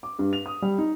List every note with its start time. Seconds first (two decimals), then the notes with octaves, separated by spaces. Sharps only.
0.03 D6
0.19 G2
0.33 F7
0.46 D#6
0.62 G3
0.78 D#4